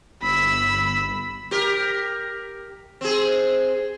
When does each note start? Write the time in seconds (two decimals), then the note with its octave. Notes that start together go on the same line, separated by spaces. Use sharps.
0.22 G1 B5 E6
1.51 G4 A#4
3.01 C4 G#4